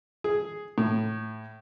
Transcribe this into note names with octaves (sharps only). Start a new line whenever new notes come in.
G#4
A2